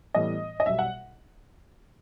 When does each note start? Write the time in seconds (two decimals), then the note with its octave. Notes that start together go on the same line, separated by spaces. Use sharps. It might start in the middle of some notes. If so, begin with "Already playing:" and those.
0.15 A2 E3 G3 B3 D#5
0.60 D#5
0.66 B1 B2 G3 E5
0.79 F#5